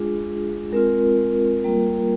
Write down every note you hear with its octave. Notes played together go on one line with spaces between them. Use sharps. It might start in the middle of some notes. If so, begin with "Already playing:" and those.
Already playing: G#3 D4 F4 G#4
G#3 C4 F4 A#4
G3 A#3 F4